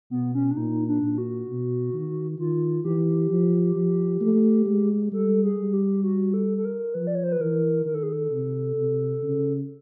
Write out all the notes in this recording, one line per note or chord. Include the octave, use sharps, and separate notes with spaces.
B2 B3
C#4
D4
A#2 D#4
D4
A#2
F#4
B2
D#3
D#3 F4
E3 G4
F3
F3
A3
G#3
G3 A4
G#4
G3
G4
F#4
A4
A4
A#4
F3 B4
D5
C#5
C5
B4
E3 A#4
D#3 A#4
A4
G#4
A4
C3
C3
C#3